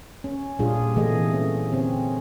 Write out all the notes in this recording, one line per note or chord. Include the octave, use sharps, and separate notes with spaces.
C#4
A#2 G3 D4 F4 G#4
C3 E3 A3 G#4 D#5
C#4
D3 C4 C#4